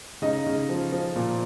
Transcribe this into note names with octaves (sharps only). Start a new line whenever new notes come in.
C#3 D#4 D#5
C#3
F3
F3
A#2